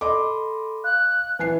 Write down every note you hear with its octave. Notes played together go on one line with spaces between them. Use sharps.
A4 D#5 B5 C6 D6
F5 F#6
E3 B4 G#5 C7